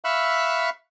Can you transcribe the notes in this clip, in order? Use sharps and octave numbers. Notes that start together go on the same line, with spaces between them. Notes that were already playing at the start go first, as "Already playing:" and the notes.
E5 F5 B5 C#6 E6 F#6